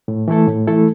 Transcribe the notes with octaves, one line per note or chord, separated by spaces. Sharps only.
A2
E3 A3 E4 A4
A2
E3 A3 E4 A4